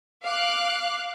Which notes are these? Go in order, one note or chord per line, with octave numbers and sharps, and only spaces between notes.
F5 D6 F#6